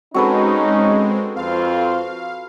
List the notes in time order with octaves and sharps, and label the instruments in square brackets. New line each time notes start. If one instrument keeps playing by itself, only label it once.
[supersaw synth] G#3 C4 [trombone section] C#4 D#4 [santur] F#4 A4 B4
[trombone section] F2 C4 F4 [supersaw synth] F5